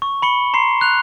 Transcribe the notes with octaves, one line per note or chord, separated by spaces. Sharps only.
C#6
B5 C#7 G7
A#5 C6 C7
F#6 F7